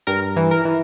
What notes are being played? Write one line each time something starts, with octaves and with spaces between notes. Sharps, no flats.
G2 A#4
E3
A#4
E3